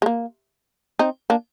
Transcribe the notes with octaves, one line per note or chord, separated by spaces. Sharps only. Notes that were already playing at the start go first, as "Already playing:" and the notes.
G#3
A#3
C4 D#4
A#3 D4